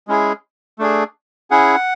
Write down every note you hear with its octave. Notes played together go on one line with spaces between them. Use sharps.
G#3 C#4 E4 G#4
A3 D4 G#4
C#4 E4 G#4 F#5